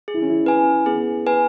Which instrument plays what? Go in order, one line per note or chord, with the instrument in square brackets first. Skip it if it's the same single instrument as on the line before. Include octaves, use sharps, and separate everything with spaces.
[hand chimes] G#4
[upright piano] E4
C#4
E4
[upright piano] C#4 [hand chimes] B4 G#5
[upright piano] B3 [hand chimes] G#4
[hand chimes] B4 G#5